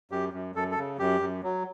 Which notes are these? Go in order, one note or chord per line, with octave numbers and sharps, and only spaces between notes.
F#2 G4
F#2
F#2 A4
A4
C#3
F#2 G4
F#2
F#3